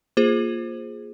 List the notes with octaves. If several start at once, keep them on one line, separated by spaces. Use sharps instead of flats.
A#3 F4 G#4 C5